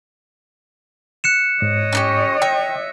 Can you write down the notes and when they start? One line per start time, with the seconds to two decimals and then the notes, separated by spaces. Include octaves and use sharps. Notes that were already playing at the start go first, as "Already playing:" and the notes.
1.24 F#6 C#7 E7
1.62 G#2 C#5 D#5
1.93 C#4 D#4 G4
2.42 E5 G5